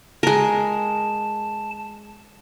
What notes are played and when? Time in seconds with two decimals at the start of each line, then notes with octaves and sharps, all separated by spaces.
0.23 G#3 A#4 A5